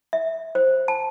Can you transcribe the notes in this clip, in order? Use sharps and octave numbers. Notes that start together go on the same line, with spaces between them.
E5
C5
A5